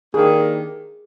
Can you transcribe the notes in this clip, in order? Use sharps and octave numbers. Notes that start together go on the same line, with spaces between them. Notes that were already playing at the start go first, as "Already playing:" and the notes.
D#3 A#3 D4 G4 G#4 A#4